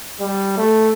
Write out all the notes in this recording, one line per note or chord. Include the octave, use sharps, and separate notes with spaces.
G3
A3